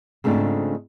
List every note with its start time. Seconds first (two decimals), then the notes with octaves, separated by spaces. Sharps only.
0.24 G#2 C#3 A3 C4 D4 F4